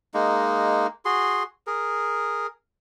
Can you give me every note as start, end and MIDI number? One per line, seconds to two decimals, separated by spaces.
0.14 0.87 56
0.14 0.87 58
0.14 0.87 63
1.05 1.43 66
1.05 1.43 68
1.05 1.43 84
1.67 2.47 68
1.67 2.47 70